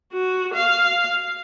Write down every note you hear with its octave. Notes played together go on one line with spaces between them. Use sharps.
F#4
F5